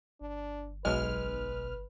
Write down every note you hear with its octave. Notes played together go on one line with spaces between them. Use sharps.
G1 D4
B1 G#3 B4 F6